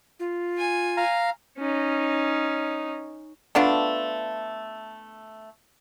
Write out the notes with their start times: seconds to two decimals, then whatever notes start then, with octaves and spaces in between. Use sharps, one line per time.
0.20 F4
0.57 G#5
0.97 F5 A#5
1.58 C#4 D#4
3.55 A3 B3 D4 F4